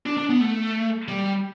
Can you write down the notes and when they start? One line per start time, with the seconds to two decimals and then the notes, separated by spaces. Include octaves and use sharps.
0.06 D4
0.17 D4
0.29 B3
0.41 A3
1.08 G3